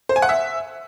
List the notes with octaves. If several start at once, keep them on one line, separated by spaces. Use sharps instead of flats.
C5
G#5
F#5
E5